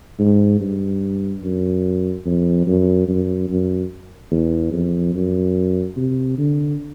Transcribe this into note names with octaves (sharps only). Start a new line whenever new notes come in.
G#2
G2
F#2
F2
F#2
F#2
F#2
E2
F2
F#2
C3
D3